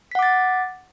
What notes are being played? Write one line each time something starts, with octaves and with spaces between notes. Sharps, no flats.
F#5 D6 A6 B6